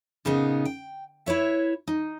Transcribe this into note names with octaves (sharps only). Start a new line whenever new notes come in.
A#2 C#3 B3 D#4
G5
E4 B4 C#5 E5
D#4